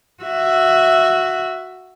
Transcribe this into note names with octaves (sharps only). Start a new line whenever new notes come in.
F#4 E5